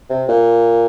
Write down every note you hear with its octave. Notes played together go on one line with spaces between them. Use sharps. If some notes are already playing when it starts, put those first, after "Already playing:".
C3
A#2